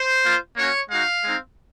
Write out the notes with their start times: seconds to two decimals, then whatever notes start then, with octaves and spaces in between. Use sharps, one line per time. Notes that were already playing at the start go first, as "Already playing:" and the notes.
Already playing: C5
0.24 A#3 F4
0.56 A#3 C#4 F#4 C#5
0.90 G#3 D#4 F#4 F5
1.24 G#3 C4 D#4